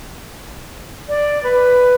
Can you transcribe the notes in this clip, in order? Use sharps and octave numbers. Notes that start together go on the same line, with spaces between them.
D5
B4